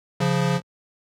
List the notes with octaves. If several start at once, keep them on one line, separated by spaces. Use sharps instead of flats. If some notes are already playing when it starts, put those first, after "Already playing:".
C#3 F3